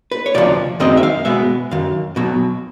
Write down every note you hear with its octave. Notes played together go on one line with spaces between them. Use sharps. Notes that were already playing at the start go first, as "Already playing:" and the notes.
B4
C#5
D2 C3 F3 D5
F#2 D#3 G#3 C4 D#5
E5
F5
B2 G#3 B3 E5
F#2 D#3 F5
B1 B2 F#3